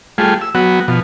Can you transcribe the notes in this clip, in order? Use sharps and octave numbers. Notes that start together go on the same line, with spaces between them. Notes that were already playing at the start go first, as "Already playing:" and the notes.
G3 A3 F4 G#4
E6
F#3 B3 F#4
B2 F3